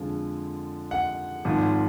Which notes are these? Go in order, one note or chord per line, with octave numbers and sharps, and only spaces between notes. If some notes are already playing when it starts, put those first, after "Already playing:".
Already playing: F2 D3 F3 G#3
F#5
G#1 G#2 F3